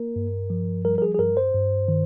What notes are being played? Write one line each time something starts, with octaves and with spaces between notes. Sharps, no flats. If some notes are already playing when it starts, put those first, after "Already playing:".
Already playing: A#3 A#4
G2
F3
G3 A#4
A#4
G#4
G#4
G2 A#4
C5
G2
D#3